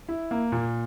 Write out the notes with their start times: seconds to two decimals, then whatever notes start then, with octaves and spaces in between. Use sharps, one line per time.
0.09 E4
0.31 A#3
0.52 A#2